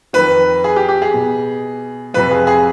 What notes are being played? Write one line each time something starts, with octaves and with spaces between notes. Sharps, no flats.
F2 D#3 B4
G#4
G4
G4
G#4
B2
F2 C3 F3 B4
G#4
G#4